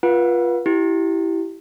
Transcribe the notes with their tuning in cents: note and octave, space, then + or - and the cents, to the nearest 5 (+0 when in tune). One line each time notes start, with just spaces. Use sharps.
F4 +0 B4 -30 F#5 -25
E4 +0 G4 -20